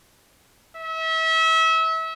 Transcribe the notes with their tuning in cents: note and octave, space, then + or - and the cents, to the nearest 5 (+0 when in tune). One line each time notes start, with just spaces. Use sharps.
E5 -30